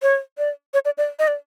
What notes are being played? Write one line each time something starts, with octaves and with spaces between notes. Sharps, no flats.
C#5
D5
C#5
D5
D5
D#5
D5